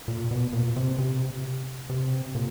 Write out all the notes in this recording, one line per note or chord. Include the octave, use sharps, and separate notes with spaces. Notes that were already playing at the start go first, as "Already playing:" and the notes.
A#2
B2
A#2
C3
C3
C3
A#2